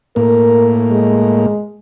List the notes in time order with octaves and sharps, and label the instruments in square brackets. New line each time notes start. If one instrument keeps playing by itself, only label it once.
[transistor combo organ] A2 A#3 [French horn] A#4
[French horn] G#3